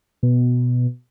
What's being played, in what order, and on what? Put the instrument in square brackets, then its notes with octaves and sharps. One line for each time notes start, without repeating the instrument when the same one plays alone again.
[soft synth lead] B2